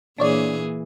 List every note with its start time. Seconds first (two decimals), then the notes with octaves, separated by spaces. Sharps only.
0.18 A#2 E3 D4 G#4 C#5 D5